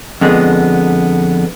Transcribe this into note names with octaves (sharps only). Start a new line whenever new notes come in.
F2 D3 G#3 B3